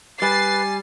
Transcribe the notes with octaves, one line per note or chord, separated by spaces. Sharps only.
G3 B4 G#5 A6 C7